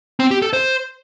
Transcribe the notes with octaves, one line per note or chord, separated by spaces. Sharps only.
C4
G4
A4
C5